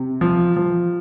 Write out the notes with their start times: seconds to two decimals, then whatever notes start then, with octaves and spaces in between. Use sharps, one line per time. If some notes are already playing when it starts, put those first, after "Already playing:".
Already playing: C3
0.21 F3
0.56 F3